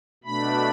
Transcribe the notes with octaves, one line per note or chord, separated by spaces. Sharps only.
B2 A3 D4 B5